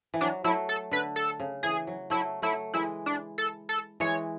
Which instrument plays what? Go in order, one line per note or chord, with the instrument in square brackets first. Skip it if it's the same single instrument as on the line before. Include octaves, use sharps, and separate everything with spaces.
[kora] E3
[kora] F#3 [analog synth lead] D4
[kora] F#3 A3 [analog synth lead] E4
[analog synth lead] A4
[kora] D3 [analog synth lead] B4
[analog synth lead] A4
[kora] C#3
[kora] E3 [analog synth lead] G#4
[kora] F#3
[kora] F#3 A3 [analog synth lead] E4
[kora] F#3 A3 [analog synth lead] E4
[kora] E3 G#3 [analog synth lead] E4
[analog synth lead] D4
A4
A4
[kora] E3 G#3 [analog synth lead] C#5